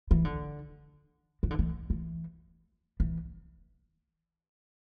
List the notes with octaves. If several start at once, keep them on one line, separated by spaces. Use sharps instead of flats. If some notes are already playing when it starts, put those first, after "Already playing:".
E3
D3
E3
D3
E3
E3
E3